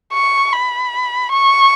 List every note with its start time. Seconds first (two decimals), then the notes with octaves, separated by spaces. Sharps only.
0.13 C#6
0.53 B5
1.32 C#6